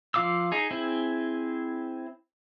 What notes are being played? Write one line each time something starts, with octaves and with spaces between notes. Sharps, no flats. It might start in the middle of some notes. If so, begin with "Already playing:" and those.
F3 F4 F5 D6 E6
D#4 G#4
C4 E4 G#4